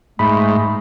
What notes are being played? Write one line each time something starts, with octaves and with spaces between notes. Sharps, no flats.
G#2 A3 B5